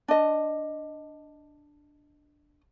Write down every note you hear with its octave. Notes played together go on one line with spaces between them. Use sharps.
D4 D#5